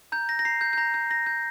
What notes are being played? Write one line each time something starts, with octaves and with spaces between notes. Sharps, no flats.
A#5 G6
G6 A#6
A#6
A#5 C7
G6
G6
A#5 A#6
G6
A#5 A#6
G6